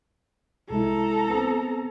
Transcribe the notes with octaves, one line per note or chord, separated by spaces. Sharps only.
C2 G#3 E4 A4 A#5
B3 C4